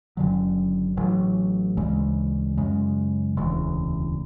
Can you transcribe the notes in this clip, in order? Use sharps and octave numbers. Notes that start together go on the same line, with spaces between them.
F#1 F#2 D3 F#3
A1 A2 F#3
D2 C#3 E3 G#3
F#2 C#3 G#3
E1 D2 C#3 E3